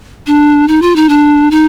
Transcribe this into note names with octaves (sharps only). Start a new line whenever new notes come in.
D4
D#4
F4
D#4
D4
D#4